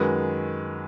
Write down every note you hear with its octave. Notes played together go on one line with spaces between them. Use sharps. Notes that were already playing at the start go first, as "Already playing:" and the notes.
Already playing: F#2 D#3 G#3 B4